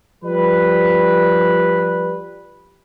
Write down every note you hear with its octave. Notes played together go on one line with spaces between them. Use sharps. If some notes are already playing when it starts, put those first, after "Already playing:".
F3 G3 B4